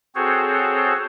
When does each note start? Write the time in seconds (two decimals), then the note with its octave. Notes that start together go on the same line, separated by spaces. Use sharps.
0.15 C4 F#4 G#4 A4 C5 C#5